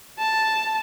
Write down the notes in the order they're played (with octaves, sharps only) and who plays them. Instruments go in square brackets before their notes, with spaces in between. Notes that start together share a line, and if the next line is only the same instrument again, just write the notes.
[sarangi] A5